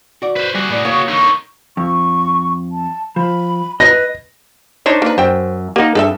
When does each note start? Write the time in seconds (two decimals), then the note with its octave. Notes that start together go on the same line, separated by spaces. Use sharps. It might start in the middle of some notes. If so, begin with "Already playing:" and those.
0.22 F#4 D5
0.36 B4 C5
0.55 G3 F#4 G#4
0.71 A2 B3 D5
0.85 A#3 C#5 F#5 D#6
1.08 D3 D#4 C#6
1.77 F2 C#6
2.72 A5
3.16 F3 B5
3.80 B4 D#5 A#6
4.86 D4 D#4 C5 C#5
5.02 A#3 B4
5.18 F#2 C5 G5
5.76 A#3 D#4 G4 F#5
5.95 G2 G#4 A4 E5